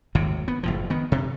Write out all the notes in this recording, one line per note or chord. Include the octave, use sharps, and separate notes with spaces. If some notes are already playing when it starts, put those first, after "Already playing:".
G#1 D#2 A2 C3
B3
F#1 A2 F3
D#3 B3
C3